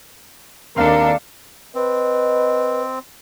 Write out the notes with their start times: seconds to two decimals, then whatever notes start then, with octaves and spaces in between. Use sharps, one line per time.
0.76 D#2 C4 D4 A4 A#4 F5
1.75 C4 B4 D#5